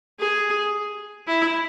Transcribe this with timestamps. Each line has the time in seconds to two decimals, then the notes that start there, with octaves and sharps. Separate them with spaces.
0.19 G#4
1.27 E4